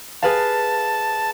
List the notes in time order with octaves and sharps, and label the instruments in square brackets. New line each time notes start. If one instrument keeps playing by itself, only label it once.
[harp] G#4 B4 F5 [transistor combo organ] A5